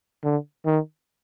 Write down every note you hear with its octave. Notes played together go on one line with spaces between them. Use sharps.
D3
D#3